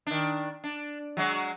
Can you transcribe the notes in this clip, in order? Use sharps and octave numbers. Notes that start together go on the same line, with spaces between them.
D#3 D4
D4
F#3 G#3 F#4